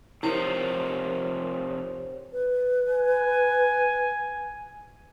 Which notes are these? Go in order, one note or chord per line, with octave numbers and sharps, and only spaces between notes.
C3 F3 D#4 E4 G4 A#4 C5 C#5
B4
G#5